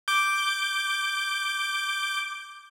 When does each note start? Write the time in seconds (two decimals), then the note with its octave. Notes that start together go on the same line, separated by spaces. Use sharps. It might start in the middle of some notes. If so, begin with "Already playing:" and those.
0.08 D6 G6